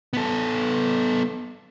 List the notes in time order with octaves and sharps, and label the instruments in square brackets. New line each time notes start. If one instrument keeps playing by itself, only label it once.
[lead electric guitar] B3 A4